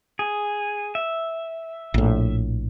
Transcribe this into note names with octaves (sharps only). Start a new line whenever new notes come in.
G#4
E5
A#1 A2